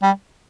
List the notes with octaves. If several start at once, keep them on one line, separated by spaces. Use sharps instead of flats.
G3